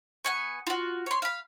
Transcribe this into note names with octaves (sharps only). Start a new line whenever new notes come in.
B3 G#5 C#6
F4 F#4
C#5 C6
F5 B5